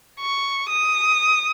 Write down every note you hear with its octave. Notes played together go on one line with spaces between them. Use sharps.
C#6
D#6